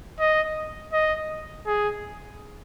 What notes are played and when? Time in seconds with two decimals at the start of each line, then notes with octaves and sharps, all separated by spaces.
0.20 D#5
0.93 D#5
1.66 G#4